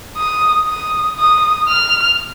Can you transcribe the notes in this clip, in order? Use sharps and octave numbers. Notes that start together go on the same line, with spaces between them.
D#6
D#6
D#6
F6